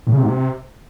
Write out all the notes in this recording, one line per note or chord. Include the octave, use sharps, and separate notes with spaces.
A2
C#3
C3
G#2
C3